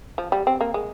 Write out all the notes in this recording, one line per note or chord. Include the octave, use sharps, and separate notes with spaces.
F3
G3
C4
A#3
G#3